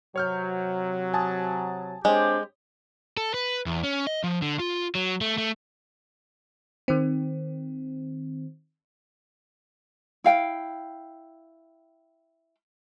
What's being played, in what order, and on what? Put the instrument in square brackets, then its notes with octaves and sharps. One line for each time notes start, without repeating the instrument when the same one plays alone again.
[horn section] C3 F#3 [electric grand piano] C#5 F6 G6
[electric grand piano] G#5 A5 D#6
[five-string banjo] G#3 [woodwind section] C4 D4 G4 [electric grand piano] C#5
[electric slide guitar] A4
B4
E2
C#4
D#5
F3
D3
F4
F#3
A3
A3
[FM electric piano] D#3 C4
[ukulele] E4 F5 G5